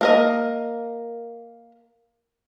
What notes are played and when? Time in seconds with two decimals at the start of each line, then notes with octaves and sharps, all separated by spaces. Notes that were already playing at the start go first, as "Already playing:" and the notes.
0.01 A#3 A#4 D#5